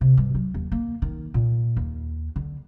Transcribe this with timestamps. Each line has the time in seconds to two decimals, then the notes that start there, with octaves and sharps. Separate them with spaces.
0.01 C3
0.17 G2
0.35 F#3
0.54 D#2
0.72 A#3
1.02 D#3
1.34 A#2
1.77 D#2
2.36 D3